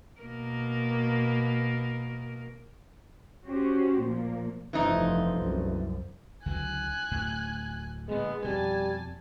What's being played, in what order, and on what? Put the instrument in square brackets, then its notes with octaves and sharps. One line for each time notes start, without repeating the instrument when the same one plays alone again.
[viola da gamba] B2 A#3 A#4
[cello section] C#4 F#4 G4 C5
A#2 F3 A#3
[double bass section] F1 G2 F3 [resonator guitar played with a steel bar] E3 A3 D#4
[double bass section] C2 F#2
[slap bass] C#2 D3 F#3 [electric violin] G#5 F#6
[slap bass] D1 D2 A2
[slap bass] A#2 D3 [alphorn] G#3 [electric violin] B3
[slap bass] F2 B2 [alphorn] G3 [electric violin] G#5 A5